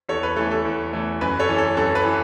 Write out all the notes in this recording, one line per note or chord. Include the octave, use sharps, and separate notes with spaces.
E2 A4 C#5
B4
E3 A3 A4
A4
E2
E3 A3
F#2 B4
A4 C#5
E3 C#4
A4
F#2 A4
B4
E3